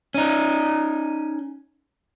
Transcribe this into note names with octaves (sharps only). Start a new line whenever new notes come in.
C#4 D#4